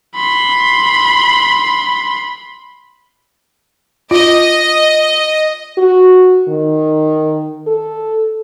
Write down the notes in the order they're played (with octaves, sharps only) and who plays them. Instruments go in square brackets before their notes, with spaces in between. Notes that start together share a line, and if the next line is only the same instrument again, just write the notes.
[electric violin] B5 C6
[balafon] F4 [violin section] D#5
[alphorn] F#4
D#3
A4